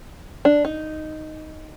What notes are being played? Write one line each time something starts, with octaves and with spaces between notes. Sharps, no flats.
D4
D#4